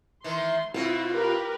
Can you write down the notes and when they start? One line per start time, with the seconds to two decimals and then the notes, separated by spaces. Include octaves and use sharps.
0.24 D#3 E3 C6
0.74 B2 C4 E4 F4
1.12 G4 A#4 B4